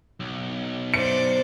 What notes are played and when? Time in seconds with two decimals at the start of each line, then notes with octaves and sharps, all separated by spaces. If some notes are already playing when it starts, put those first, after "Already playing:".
0.20 B1
0.94 C5 D5 C#7